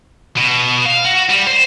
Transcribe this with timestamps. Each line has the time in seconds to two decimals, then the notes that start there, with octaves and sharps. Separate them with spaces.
0.37 B2
0.86 F5
1.05 F#4
1.29 G3
1.47 C5